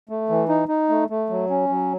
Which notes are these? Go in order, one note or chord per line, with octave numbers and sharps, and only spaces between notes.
A3
E3
D#4
D#4
A3
A3
F#3
C#4
F#3